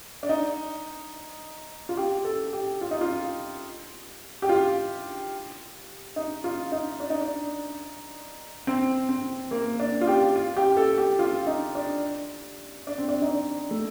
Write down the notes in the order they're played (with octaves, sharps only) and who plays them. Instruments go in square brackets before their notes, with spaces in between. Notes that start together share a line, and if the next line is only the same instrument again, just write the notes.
[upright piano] D4
D#4
F4
G4
A4
G4
F4
D#4
F4
G4
F4
D#4
F4
D#4
D4
D#4
D4
C4
C4
A#3
D4
F4
G4
F4
G4
A4
G4
F4
D#4
D4
D4
C4
D4
D#4
D4
A3